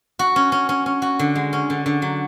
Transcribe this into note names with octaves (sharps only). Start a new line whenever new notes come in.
F#4
C#4
C#4
C#4
C#4
F#4
D3
G#3
C#4
D3
D3
F#3